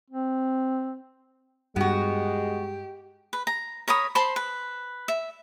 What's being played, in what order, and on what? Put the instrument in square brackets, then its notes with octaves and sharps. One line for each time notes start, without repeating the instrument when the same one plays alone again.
[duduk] C4
[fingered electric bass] G2 [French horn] G#3 [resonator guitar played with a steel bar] B3 F#4 [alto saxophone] G4
[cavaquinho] B4
A#5
A#4 C#5 B5 D#6
C5 A5 B5 C6
B4
E5